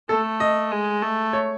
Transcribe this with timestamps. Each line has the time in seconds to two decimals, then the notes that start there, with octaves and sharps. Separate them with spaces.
0.09 A3 A4
0.40 D#5
0.72 G#3
1.02 A3
1.33 C#5